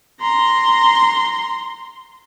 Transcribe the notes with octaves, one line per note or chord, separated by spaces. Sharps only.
A#5 C6